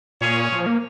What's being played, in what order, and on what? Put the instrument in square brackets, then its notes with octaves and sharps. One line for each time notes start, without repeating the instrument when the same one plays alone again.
[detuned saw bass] A#2 [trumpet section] C#4 G#4 C#5 F5
[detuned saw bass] F3
A#3